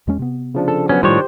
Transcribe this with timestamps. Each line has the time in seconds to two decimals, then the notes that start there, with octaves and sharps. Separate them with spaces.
0.07 E2 G#3 C#4
0.19 C3 B3
0.55 C#3 F3 D4
0.68 A4
0.89 F#3 B3 C#4
1.03 A2 D#3 F3 G3 D4 G4 C5 C#5